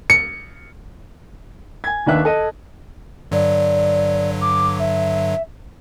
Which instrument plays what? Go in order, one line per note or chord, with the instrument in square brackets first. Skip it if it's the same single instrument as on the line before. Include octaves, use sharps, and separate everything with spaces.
[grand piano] C#7
[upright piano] G#5 G#6
D#2 D#3 D4 B4 E5 F#6
A4 D#5 D#7
[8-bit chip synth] G2 D3 F#3 [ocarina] D5
[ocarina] D6
E5